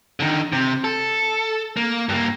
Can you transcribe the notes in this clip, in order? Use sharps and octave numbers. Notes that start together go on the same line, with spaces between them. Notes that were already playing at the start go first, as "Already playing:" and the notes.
D3 D#3
C3
A4
A#3
G2 A#3